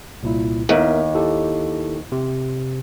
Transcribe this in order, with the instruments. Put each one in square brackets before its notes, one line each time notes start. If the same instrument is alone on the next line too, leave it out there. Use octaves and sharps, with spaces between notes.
[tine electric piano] C2 A#2 E4
[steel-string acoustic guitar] D#2 [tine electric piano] B3 A#4 E5
[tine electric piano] E4 G4 A4
C3